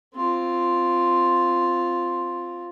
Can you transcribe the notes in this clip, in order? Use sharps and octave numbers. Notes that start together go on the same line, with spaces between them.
C4 F4